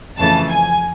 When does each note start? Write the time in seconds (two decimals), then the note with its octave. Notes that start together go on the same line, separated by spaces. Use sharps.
0.18 F2 C#3 E3 A3 A5
0.50 G#5